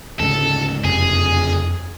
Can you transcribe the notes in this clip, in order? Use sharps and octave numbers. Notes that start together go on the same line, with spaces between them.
D2 G#2 C#3 A4
F#1 F2 C3 G#4